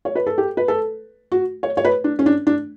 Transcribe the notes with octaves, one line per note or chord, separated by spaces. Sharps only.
C#5
B4
A4
G4
B4
A4
F#4
C#5
C#5
B4
D4
C#4
D4
D4